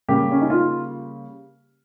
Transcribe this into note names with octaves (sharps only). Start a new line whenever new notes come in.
C#3 G3 A#3 G4
C#4
D#4
F4